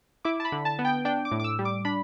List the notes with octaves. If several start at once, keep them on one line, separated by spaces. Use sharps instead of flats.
E4 D6
A5
B5
D3
A5
B3
G5
D4 G5
D6
A2
D6
E6
G3
D6
D4 B5